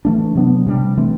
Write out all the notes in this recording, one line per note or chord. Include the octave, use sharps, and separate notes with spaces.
E3 A3 D4
C3 F#3 B3 D4
C3 G3 D4
E3 A3 C4